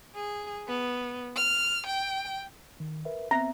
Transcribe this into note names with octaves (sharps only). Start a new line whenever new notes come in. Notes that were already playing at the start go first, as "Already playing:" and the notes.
G#4
B3
F6
G5
D#3
A#4 B4 E5
B3 C4 E5 A#5